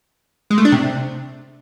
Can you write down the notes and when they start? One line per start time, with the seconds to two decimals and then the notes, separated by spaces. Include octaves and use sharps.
0.50 G#3
0.58 A3
0.65 D4
0.72 C3